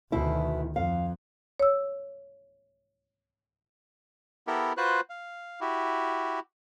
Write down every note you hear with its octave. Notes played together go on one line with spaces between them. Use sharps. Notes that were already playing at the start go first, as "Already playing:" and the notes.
D2 B2 D#3 E4
F2 F5
C#5 E6
B3 E4 G4 A4 A#4
F4 F#4 B4 C5 F#6
F5
E4 F#4 G4